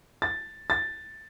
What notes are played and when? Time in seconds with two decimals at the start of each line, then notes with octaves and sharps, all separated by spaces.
0.22 A6
0.70 A6